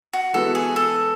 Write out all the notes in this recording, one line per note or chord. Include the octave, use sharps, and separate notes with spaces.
F#4
E3 G#3 B3 F#4 A4
G#4
A4